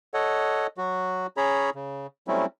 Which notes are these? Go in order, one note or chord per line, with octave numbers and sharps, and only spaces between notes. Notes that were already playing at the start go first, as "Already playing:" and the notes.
A4 C#5 D#5 F#5
F#3 F#4
C#4 G#4 C#5 A#5 B5
C#3
F#3 G3 A3 C4 C#4 E4